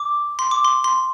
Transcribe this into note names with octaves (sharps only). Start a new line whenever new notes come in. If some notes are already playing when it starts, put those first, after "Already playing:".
Already playing: D6
C6
D6
C6
C6